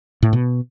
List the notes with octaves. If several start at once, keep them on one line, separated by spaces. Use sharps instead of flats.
A2
B2